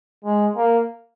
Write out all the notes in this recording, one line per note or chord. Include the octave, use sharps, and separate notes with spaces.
G#3
A#3